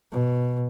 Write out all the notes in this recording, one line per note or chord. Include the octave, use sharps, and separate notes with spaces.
B2